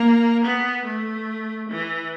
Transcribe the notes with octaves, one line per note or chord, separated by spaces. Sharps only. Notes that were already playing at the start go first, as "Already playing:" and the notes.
Already playing: A#3
B3
A3
E3